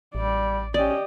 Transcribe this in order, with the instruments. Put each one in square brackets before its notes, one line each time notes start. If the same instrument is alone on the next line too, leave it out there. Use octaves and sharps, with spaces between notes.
[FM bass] A1 [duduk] G3 [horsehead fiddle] D5
[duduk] C#4 [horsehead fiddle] G4 D#5 [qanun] D5